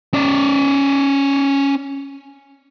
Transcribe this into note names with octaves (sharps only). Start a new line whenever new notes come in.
C#4 D5